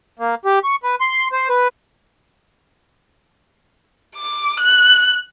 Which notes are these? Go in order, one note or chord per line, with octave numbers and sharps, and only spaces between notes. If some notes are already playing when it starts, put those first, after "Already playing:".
A#3
G4
C#6
B4
C6
C5
B4
D6
F#6